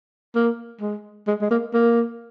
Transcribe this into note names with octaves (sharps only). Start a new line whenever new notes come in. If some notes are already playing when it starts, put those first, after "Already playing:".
A#3
G#3
G#3
G#3
A#3
A#3